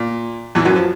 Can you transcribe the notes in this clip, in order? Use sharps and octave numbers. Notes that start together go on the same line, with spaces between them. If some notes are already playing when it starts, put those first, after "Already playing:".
Already playing: A#2
E2 E3
F#2 F#3
F3